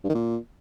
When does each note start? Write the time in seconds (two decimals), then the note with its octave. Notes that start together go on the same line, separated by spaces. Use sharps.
0.04 G2
0.09 D#3
0.15 A#2